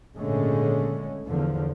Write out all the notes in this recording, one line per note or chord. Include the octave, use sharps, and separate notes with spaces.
G#1 A#2 D3 G#3 A3 C#4
E2 D3 F3